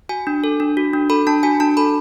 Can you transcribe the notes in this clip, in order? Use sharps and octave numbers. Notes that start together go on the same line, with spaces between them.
F#4 G#5
D4
A4
D4
F#4
D4
A4 B5
D4 A5
F#4 G#5
D4 A5
A4 B5